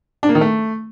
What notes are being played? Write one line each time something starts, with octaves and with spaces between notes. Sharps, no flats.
D4
A#3
D#3
A3